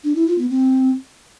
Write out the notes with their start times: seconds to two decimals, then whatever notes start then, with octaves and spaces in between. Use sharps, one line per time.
0.04 D4
0.15 E4
0.27 F4
0.38 B3
0.50 C4